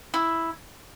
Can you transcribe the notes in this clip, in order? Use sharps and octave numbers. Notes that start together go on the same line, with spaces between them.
E4